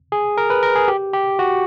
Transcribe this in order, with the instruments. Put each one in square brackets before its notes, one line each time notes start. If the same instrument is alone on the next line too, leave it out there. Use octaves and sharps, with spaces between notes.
[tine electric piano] G#4
A#4
B4
A#4
G#4
G4
G4
F#4